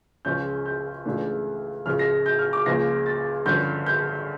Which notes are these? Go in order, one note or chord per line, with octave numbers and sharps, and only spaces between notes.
C#2 C#3 F3 C#4 G6
G6
C#2 C#3 E3 A3 D4
C#2 C#3 F3 F6
A#6
G6
F6
D6
C#2 C#3 F3 A#3 A#6
A6
G2 D3 F3 C#4 G6
G6